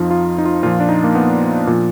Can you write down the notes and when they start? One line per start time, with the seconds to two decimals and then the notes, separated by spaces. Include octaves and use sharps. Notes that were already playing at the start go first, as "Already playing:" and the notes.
Already playing: F2 F3 D#4 F4
0.10 F4
0.38 D#4
0.45 F4
0.63 A#2 F3 F4
0.80 D4
0.89 D#4
1.04 A#3
1.15 B3
1.67 A#2 F3